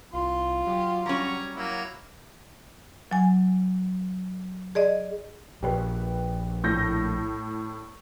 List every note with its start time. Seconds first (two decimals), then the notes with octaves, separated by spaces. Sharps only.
0.13 C2 F4 C6
0.67 F#3 G4
1.06 G3 C#4 C#5 A#5 C#6
1.55 F#3 A#3 E4
3.11 F#3 G#5
4.75 G#4 D5 D#5
5.63 A#1 G4 B4
6.64 A2 G6 A#6